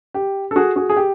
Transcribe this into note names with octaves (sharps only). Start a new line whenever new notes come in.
G4
A4
F#4 G#4
F#4 G#4
G#4
G4